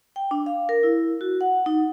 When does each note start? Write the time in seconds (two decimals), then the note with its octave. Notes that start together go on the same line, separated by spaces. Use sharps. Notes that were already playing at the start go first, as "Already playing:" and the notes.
0.16 G5
0.31 D4
0.46 F5
0.69 A#4
0.83 E4
1.21 F#4
1.41 F#5
1.66 D#4